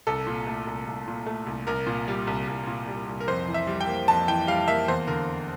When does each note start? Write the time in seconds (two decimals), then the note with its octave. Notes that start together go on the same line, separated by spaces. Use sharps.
0.07 C2 A4
0.27 A#2
0.47 A3
0.67 C2
0.87 C2
1.08 A#2
1.26 A3
1.46 C2
1.67 C2 A#4
1.87 A#2
2.08 G3
2.27 C2
2.48 C2
2.67 A#2
2.88 G3
3.07 C2
3.20 A#4
3.28 F2 C5
3.47 E3
3.54 E5
3.67 G3
3.81 G5
3.87 A#3
4.08 F2 A5
4.28 E3 G5
4.47 G3 F5
4.68 A#3 E5
4.88 E2 C5
5.07 D3 A#4